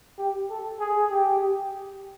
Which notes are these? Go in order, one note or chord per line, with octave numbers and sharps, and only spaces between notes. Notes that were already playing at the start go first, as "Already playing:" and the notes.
G4
A4
G#4
G4